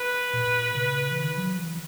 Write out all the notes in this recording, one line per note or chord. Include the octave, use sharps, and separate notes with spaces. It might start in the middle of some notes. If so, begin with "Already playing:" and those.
Already playing: B4
A#2
C#3
E3
D#3
F#3
E3